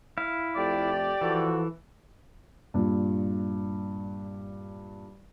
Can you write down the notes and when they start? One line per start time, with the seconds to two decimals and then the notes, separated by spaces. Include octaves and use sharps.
0.18 E4 F5
0.55 F2 A3 G4 D5
1.21 E3 F3 F#4 A4
2.74 G2 A#2